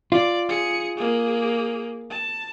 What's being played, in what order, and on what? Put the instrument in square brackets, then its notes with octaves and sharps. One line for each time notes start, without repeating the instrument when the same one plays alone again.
[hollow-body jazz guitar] F4 [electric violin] D5
[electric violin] G#4 C#7
A#3 G#4
A5